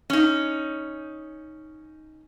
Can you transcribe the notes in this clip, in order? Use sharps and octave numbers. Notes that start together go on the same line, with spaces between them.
C#4 D#4